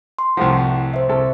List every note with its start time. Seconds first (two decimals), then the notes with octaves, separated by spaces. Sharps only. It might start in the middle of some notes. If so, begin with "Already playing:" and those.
0.19 C6
0.37 C2 A2 F3 E4 F#5
0.94 C5 E5
1.09 C2 A4